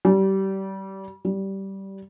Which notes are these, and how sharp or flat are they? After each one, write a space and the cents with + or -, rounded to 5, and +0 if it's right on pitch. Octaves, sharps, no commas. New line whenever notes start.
G3 -25
G3 -15